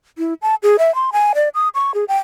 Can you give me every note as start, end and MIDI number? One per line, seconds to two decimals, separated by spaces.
0.18 0.34 64
0.42 0.55 81
0.63 0.76 68
0.79 0.93 76
0.95 1.10 84
1.13 1.32 80
1.35 1.49 74
1.55 1.68 87
1.75 1.94 85
1.94 2.05 68
2.08 2.17 79